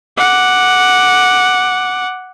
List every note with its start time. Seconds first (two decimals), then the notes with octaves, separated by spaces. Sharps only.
0.17 F#5 D6